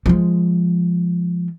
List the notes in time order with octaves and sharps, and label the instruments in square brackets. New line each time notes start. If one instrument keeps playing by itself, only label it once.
[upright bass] F3 G#3